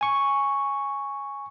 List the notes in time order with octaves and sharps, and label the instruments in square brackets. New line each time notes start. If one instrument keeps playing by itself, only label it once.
[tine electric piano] G#5 C#6